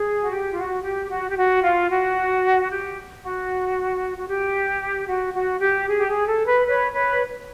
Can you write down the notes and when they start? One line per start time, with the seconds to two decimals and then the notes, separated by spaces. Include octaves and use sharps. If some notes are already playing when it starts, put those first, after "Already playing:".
Already playing: G#4
0.20 F#4
0.32 G4
0.50 F4
0.58 F#4
0.84 G4
1.10 F#4
1.30 G4
1.37 F#4
1.63 F4
1.90 F#4
2.70 G4
3.23 F#4
4.17 F#4
4.28 G4
5.07 F#4
5.34 F#4
5.61 G4
5.87 G#4
5.97 G4
6.08 G#4
6.26 A4
6.46 B4
6.67 B4 C#5
6.93 B4 C#5